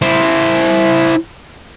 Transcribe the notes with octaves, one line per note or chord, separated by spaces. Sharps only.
E4 C5